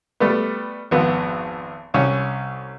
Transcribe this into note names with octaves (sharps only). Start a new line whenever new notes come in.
G3 A3 B3
G#1 F2 B3 F#5
C2 C#4 C#5